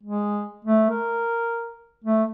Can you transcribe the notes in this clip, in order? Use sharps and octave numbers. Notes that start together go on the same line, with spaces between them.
G#3
A3
A#4
A3